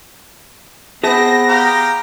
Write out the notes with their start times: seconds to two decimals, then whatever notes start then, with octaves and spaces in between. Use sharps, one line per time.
1.04 B3 C4 G#4 E5 A5 A#6
1.48 G4 F5 A#5